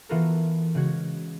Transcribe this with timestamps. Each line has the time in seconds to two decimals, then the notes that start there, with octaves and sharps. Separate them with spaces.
0.09 E3 B3 F4 F#4 A4 A#4
0.75 C#3 G#3 F#4 G#6